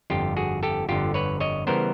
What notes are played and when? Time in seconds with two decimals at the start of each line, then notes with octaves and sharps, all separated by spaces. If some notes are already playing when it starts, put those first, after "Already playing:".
0.10 G1 F2 D3 F4 G4
0.37 F#4 G#4
0.63 G4 A4
0.89 G1 F2 D3 F4 G4
1.14 B4 C#5
1.40 C#5 D#5
1.67 C#3 E3 G3 B3 A#4 C5